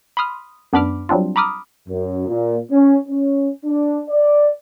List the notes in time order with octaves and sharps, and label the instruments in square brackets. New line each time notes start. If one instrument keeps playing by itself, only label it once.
[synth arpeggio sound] B5 C6 D#6 F6
F#2 B3 D4 B5 D6 F6
F#3 G3 C4 D4 F4
A#5 B5 D6 D#6 F6
[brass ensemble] F#2
A#2
C#4
C#4
D4
D5